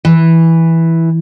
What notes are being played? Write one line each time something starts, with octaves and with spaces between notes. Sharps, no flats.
E3